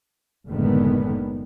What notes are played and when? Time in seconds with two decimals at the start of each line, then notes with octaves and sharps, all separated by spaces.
0.47 F#1 A2 D3 D#3 G#3 B3